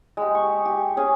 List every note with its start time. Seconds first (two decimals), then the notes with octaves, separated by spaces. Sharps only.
0.17 G#3 G4
0.35 C#6
0.65 G4
0.97 C#4 G#4